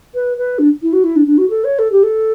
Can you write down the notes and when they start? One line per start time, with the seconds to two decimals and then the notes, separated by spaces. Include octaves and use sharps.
0.14 B4
0.37 B4
0.59 D4
0.82 E4
0.93 F#4
1.04 E4
1.16 D4
1.27 D4
1.38 F#4
1.50 A4
1.64 C#5
1.79 A4
1.92 G4
2.03 A4